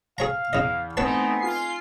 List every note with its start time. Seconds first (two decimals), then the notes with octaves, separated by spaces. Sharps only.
0.18 G#4 C#5 F5 A#5
0.53 E2 C#3 D#5
0.97 A3 B3 C4 D#4 B4 C#5 G#5 A5
1.40 F4 C7